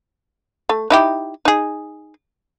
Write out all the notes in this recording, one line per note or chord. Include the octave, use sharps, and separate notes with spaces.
A3
D#4 E4 G4
D#4 G#4